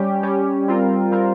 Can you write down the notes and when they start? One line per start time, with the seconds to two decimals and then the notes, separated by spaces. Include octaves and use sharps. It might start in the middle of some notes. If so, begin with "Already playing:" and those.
Already playing: G3 C#4 G4
0.23 G3 C#4 G4
0.68 G3 C4 F4 A#4
1.12 G3 C4 F4 A#4